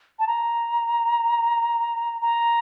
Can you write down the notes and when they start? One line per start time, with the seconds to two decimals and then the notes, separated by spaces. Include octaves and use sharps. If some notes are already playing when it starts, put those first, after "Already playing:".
0.19 A5
0.27 A#5
2.22 A#5